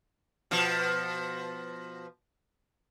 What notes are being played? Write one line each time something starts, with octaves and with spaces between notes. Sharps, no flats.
B2 F3